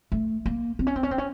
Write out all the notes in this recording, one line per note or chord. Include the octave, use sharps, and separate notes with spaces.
A3
A#3
C4
C#4
C4
C#4
C4
C#4